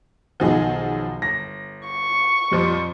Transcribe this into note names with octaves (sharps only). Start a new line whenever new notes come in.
B1 D#3 F3 F#3 G#4 F#5
G1 A#6
C#6
F2 A#2 F3 G3